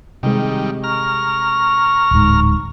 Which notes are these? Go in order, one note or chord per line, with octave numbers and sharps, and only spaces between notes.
C3 D#3 G3 G#3
A#5 C#6 F6
D1 G#2